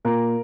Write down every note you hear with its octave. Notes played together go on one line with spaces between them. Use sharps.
A#2 A#4